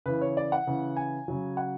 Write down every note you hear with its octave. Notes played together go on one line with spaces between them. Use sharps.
C#3 E3 B4
C#5
D5
F#5
C#3 E3
G#5
C#3 F#3
F#5